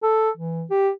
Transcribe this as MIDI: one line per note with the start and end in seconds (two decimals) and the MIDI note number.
0.03 0.30 69
0.37 0.64 52
0.70 0.90 67